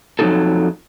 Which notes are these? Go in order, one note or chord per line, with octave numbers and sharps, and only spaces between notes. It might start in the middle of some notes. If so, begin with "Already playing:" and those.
F2 F#3 G3 D#4 G#4 A4